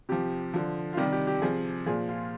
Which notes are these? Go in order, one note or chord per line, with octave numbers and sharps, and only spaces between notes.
C3 F3 G4
D3 F3
F4
C3 D#3 G3 G4
G4
G4
C3 F3 G#4
A#2 F3 G#4
F4